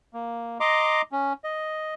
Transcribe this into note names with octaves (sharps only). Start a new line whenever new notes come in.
A#3
D#5 A#5 C6 D6
C#4
D#5